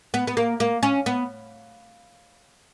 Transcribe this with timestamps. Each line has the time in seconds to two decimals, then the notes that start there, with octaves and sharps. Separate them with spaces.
0.14 B3
0.27 B3
0.37 A#3
0.60 A#3
0.83 C#4
1.06 B3